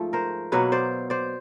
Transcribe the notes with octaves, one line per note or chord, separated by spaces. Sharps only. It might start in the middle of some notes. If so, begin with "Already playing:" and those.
Already playing: G#2 F3 A3
A#4 C5
B2 F#3 A#3 B4 C#5
C5 D5
C5 D5